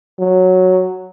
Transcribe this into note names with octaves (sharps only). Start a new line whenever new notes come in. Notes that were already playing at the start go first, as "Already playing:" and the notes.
F#3